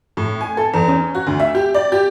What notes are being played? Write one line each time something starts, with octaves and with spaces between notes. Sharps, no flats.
A2
G#5
A4
E2
C#4
F#4
D2
E5
G4
D5
G4